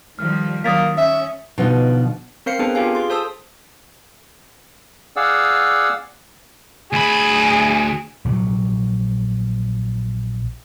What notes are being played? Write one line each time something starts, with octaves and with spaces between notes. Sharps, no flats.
D#3 F3 G3 F6
D#3 F#3 A#3 D#6 A6 B6
C#4 E5
B2 D3 F3 B3 D#4
C4 A#4 C5 F5 C7 C#7
B3 C4 D4 G#4 A4 B4
F4 G4 G#4 F5 G#5
G#4 C6
A4 C5 A5 D#6 E6
G#4 D5 F5 F#5 E6
D2 G#4 B5
A#1 C3 F3 F#3